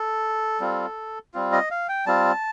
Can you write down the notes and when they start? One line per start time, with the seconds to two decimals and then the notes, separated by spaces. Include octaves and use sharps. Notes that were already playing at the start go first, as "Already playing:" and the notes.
Already playing: A4
0.60 G3 C4 F4
1.34 G3 C4 F4
1.52 D#5
1.71 F5
1.89 G5
2.06 G3 C4 F4 A5